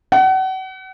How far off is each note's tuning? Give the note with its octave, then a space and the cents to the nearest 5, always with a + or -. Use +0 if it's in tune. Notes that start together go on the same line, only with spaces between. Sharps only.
F#5 +35